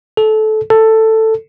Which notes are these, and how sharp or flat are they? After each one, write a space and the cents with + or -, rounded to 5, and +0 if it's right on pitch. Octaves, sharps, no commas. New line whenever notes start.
A4 -20
A4 +10